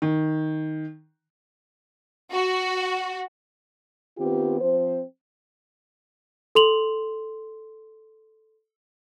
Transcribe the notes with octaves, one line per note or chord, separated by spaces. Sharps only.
D#3
F#4
D#3 B3 C4 F4 G4
F3 C4 C5
A4 C6 F7 F#7